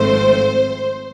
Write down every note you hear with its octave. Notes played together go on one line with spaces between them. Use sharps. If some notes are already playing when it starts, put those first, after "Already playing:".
Already playing: G#1 G#2 F3 A3 C4 C5